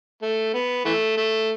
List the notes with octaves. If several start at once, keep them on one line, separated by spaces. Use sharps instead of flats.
A3
B3
E3 A3
A3